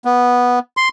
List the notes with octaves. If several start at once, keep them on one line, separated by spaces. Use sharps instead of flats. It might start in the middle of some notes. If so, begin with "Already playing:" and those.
B3
C6